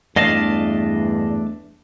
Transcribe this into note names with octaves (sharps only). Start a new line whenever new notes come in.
E2 G2 A3 D4 D#5 F5 A5